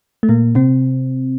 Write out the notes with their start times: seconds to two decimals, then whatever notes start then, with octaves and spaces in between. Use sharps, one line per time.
0.23 A3
0.29 A#2 A#3
0.55 C3 C4